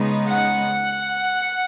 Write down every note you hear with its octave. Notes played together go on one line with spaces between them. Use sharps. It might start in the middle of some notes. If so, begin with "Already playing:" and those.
Already playing: C#3 G#3 B3 D#4
F#5